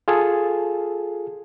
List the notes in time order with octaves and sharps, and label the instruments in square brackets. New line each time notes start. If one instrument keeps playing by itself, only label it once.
[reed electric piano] F4 G#4 A4